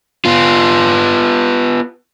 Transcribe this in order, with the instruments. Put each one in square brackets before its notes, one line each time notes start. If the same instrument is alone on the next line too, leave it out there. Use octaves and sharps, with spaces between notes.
[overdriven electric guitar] B3 F4